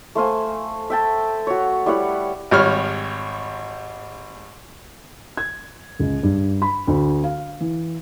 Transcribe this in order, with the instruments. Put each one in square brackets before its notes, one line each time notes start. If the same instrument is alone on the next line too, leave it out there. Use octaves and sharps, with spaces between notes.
[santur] A3 C5 F5 G#5
E5 G5 A5
F#4 C#5
G3 E4 C#5 F#5
[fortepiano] G#1 G3 C#5 F6
[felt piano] G#6
C#2
G2
B5
D2
F5
E3